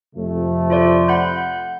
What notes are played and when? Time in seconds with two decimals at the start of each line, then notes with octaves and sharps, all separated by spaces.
0.15 F2 C3 A3
0.70 F4 C5 D5
1.08 F#5 B5 G6